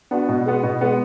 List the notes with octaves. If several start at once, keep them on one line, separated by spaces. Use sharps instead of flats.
B3 D4 F#4
B2
G#3 B3
B2
G#3 B3